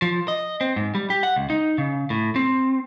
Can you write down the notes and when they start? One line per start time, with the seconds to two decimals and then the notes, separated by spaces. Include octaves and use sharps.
0.02 F3
0.28 D#5
0.61 C4
0.76 G#2
0.95 G3
1.10 G4
1.23 F#5
1.36 C#2
1.50 D#4
1.78 C#3
2.10 A2
2.36 C4